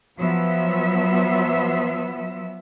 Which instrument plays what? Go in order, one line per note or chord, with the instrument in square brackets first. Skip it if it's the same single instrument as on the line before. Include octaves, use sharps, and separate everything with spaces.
[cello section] F3 F#3 B3 E5